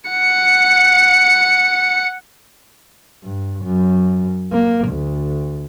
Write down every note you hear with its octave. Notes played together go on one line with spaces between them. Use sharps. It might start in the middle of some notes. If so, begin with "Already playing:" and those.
F#5 C#7
G2
F#2
A#3
D2